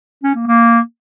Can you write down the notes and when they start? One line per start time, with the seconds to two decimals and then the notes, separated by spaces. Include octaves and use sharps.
0.24 C#4
0.35 A#3
0.47 A#3